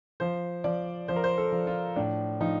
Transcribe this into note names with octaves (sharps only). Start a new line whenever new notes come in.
F3 C5
F3 D5
F3 C5
A#4
C5
A4
F3
F4
A2 D4
F3 D#4